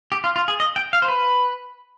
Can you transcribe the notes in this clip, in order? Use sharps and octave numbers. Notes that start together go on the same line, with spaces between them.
G4
F4
F4
G#4
D#5
G5
F5
C5
B4